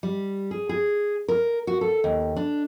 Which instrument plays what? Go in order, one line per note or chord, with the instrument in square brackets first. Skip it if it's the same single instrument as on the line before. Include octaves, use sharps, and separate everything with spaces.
[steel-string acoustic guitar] G3
G#4
G#4
A#4
F#4
A4
D#2
D4